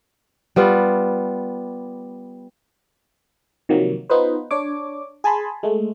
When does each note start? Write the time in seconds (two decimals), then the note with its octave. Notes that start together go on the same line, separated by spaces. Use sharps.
0.56 G3 B3 F4
3.69 C3 D#3 F3 F#3 A#3
4.10 B3 D#4 F4 B4 C5
4.51 D4 C#5 D6
5.24 G#4 G#5 A5 B5 C6
5.63 G#3 A3